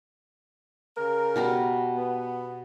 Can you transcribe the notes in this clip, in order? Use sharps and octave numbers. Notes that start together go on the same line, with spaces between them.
C#3 A#4
B2 G3 A#5
B3